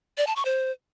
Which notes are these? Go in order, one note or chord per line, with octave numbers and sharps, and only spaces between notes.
D5
A5
C#6
C5